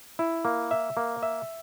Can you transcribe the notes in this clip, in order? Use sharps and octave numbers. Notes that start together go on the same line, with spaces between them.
E4
A#3
E5
A#3
E5